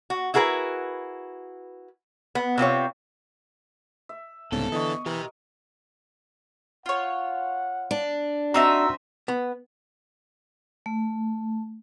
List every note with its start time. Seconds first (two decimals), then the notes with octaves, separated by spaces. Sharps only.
0.10 F#4
0.34 E4 F#4 G#4 A#4 B4
2.35 B3
2.58 C3 C4 F4 C#5
4.09 E5
4.52 C2 G#2 C#3 B3 A4
4.72 D3 E3 D#5 C#6
5.06 E3 G4 A#4 E5
6.86 F4 C#5 F#5
7.91 D4
8.54 C4 D#4 F#4 E5 A#5 E6
9.28 B3
10.86 A3